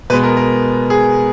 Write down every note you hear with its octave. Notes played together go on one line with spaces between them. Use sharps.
B2 G#3 B3 B4
A#4
A#4
G#4